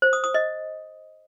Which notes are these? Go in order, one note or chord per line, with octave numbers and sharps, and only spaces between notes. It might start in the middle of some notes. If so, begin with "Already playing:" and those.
C5
D#6
D#6
D#5